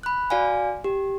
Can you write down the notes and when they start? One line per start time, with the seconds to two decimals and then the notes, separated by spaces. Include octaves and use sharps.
0.03 B5 F#6
0.30 F#4 D5 F5 G#5
0.84 G4